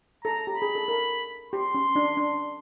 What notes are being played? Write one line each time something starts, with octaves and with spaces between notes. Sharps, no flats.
A4 A#5
G4
B5
G#4
A4
A#4
G4 C6
C#4
D4
D4